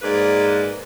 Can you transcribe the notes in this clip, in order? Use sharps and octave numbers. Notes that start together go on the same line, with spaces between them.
G#2 A#3 B4 D5